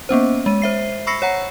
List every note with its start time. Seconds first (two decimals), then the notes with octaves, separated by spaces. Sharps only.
0.09 A#3 B3 C#4 C5
0.46 G#3 D#7
0.62 C5 E5 C7
1.07 B5 C#6 E6 A#6 C7 C#7
1.22 C#5 F#5 A#5